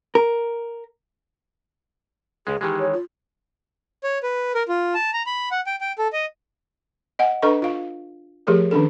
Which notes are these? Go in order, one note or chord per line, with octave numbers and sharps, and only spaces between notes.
A#4
C#2 G#3 G#4
D#3 E3 G#3 G4
C#5
F4
C#5
B4
A#4
F4
A5
A#5
B5
F#5
G5
G5
A4
D#5
D#5 F#5 G#5
D4 A4 B4 D#5 A#5 C#6
F4 F5
F3 A3 G4 G#4 A#4
D#3 C#4 D4 A4